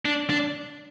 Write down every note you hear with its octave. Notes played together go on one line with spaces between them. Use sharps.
D4
D4